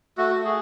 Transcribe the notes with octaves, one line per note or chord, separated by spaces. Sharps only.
A3 F#4
A3
G#4